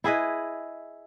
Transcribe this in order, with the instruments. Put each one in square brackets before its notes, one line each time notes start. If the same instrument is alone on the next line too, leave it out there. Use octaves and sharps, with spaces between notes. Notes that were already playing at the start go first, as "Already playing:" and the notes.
[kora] E4 G#4 B4 D#5